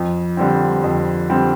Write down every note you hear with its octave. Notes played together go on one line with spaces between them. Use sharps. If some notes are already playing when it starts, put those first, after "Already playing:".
Already playing: F2
D3 G3 C4
F2
D3 G3 C4